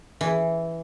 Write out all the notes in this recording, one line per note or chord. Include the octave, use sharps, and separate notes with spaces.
E3